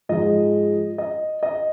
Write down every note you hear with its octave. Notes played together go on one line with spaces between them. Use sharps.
G#2 F3 G#3 D#5
D#5
D#5